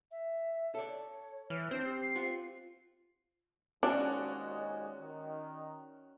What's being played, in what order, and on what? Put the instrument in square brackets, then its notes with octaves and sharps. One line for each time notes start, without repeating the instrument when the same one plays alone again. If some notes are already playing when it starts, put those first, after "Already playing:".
[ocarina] E5
[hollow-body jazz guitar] A4 D5 [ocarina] C#5
[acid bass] E3 [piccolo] F6
[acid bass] C4 [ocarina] D4 [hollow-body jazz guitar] C5 [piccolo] G6
[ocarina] G4 [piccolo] C7
[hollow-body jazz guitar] F4 F#5
[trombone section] D#2 G#2 G#3 [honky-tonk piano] C#4 F#4 D5 [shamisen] D4
[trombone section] D#3